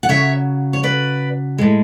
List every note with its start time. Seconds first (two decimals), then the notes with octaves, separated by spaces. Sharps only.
0.03 F#5
0.09 C#3 F#3 C#5 E5
0.73 C#5
0.83 B4 D5
1.58 A2 G#3